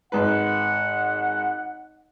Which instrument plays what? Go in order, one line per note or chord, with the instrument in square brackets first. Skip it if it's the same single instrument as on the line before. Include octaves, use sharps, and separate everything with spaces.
[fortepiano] G#1 B4 [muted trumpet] F#5